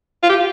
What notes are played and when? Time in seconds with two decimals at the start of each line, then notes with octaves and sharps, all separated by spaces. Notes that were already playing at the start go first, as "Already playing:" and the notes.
0.23 F4
0.29 G4